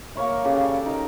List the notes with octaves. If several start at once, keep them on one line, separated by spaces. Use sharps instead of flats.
A#3 A#4 C#5 E5
C#3 G4 A4 F#5
D5
D#4 A#4